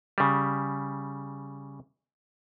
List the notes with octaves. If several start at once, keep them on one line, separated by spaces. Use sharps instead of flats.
C#3 G3